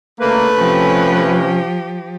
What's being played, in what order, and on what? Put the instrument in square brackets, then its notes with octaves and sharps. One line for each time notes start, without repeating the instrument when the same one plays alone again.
[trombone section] C#2 D3 A#3 [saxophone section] A3 B4
[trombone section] C3 C#4 [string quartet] F3 G4